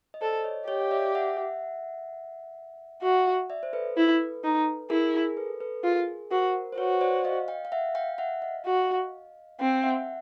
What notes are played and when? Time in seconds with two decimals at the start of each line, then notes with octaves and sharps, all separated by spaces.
0.14 D#5
0.21 A4 C5 D5
0.44 C#5 D#5
0.68 G4 C#5 D#5
0.82 F5
0.91 D5 E5
1.15 E5 F#5
3.02 F#4 E5 F#5
3.50 D5 E5
3.63 C5
3.73 A4 B4
3.97 E4
4.44 D#4
4.90 E4 G#4 A#4
5.13 G#4 A#4
5.37 A4 B4
5.60 A4 B4
5.83 F4 G#4 A#4
6.31 F#4 A#4 C5
6.72 C5
6.78 F#4 B4 C#5
7.01 C5 D5
7.25 D#5 F5
7.48 F5 G5
7.65 F5
7.72 E5 F#5
7.95 F5 G5
8.18 E5 F#5
8.42 D#5 F5
8.65 F#4
9.59 C4 F5 G5
9.73 G5
9.83 E5 F#5